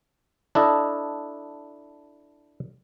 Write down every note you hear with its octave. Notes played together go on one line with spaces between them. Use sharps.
D4 E4 A4 D#5